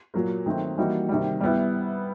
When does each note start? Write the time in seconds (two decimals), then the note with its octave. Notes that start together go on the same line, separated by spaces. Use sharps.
0.14 A#2 F#3 A#3
0.46 D#3 F#3 A3 C4
0.77 E3 G3 A#3 D#4 F#4
1.09 C3 D#3 G3
1.41 G3 B3 E4